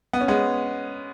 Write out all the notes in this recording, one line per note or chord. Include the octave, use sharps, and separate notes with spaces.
B3
C#4
G#3 B3